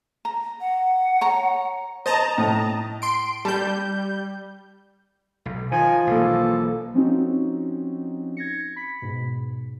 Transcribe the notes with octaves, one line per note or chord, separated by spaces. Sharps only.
A#5
F#5
C#5 A#5
C5 D#5 A5 A#5
A2
C6 D7
G3 A5 G6
B1
D#3 F3 G#5
B1 E3 A#3 A4
F3 C4 C#4 D#4 F#4
G#6 A#6 C#7
B5 B6
G#2 B2